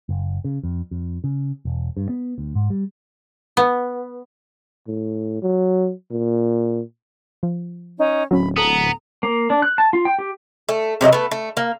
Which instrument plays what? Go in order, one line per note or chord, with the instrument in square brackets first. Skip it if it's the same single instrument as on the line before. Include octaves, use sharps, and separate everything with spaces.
[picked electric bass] F#1
C#3
F2
F2
C#3
E1
G2
B3
D2
G#2
G3
[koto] B3
[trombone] A2
F#3
A#2
[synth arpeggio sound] F3
[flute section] C#4 D#4
[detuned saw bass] D1 [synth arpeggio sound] F#3 C#4 [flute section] B5
[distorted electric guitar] B3 [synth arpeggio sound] A4 D#6 [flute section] A#5
[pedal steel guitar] A#3
D4
F#6
A5
F4
G5
G4
[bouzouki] A3
C3 F#3 D#5 E5
A3 B3
A3
A#3